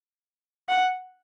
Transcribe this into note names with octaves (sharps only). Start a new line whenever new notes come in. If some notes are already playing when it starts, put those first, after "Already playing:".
F#5